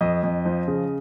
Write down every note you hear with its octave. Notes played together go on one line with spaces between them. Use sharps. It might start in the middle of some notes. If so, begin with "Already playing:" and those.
F2 D#5
F2
F3
C#3